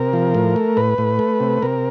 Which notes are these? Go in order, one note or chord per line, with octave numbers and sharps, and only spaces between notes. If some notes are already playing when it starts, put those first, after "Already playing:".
Already playing: C3 A#4
F3
A2
A3
A2 B4
A2
A3
C3
C3 A#4